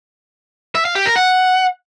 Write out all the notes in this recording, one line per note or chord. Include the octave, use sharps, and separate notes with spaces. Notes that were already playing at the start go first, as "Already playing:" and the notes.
E5
F5
G4
A#4
F#5